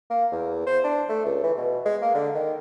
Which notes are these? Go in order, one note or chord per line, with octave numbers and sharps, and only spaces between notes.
A#3
E2
C5
D4
A3
C#2
E3
B2
G#3
A#3
D3
D#3